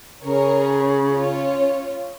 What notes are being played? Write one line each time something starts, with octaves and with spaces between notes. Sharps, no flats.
C#3 G#4 A#4 C#5
C#4 F4 C#5